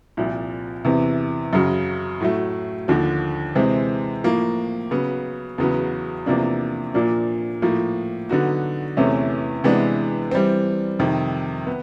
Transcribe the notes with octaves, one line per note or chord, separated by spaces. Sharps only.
C2 A#2 F3
E2 C3 E3
F#2 C#3 F#3
A2 F#3 A3
D#2 D3 F3
C3 E3 G#3 C4
A2 F3 A#3
C#3 F#3 B3
E2 C#3 F#3 B3
E2 C3 F3 A#3 D4
A#2 F3 A#3 D4
A2 F3 A#3
D3 F#3 B3 D#4 F#4
E2 C3 E3 A3 C#4
C3 E3 G#3 B3 D4
E3 G3 C4
F2 C3 D#3
B3